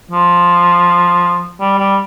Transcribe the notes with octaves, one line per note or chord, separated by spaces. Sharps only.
F3
G3
G3